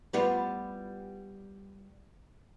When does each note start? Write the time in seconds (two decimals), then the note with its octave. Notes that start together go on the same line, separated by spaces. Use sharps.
0.13 G3 B3 F4